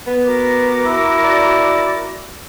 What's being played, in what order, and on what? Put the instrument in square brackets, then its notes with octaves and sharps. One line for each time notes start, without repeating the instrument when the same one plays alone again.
[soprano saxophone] B3
[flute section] F#4 A#4 D6
[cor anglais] E4
[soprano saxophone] D5